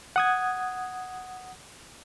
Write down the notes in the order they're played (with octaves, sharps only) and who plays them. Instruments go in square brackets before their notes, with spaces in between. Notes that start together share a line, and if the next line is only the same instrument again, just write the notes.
[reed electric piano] F#5 D#6 G#6